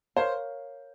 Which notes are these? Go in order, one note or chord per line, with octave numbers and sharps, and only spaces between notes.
A#4 C5 C#5 F5